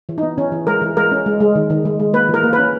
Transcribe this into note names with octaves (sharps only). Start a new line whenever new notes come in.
E3
D#4
B3
E3 C#4
E3
G#3 A#4
E3
G#3 A#4
C#4
G#3
G#3
D#3
D#3
G#3
G#3
A#3 B4
E3
A#4
A#3
B4
C#4